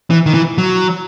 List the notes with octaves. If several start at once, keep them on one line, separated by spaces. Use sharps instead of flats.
E3
D#3
E3
F#3